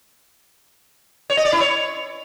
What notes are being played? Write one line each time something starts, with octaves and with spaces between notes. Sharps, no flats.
C#5
D#5
D5
E4
C#5